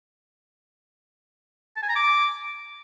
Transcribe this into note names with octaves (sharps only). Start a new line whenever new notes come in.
A5
G#5
A#5
D6